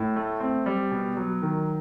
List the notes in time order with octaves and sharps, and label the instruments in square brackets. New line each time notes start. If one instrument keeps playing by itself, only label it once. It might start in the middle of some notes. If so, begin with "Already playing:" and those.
Already playing: [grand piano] A2
A3
C4
G3
B2
F#3
D#3